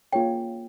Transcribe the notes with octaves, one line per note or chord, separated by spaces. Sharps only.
A#3 C#4 F4 G#4 C#5 G5